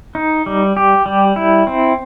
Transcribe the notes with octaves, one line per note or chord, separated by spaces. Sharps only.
D#4
G3
G4
G3
E4
C4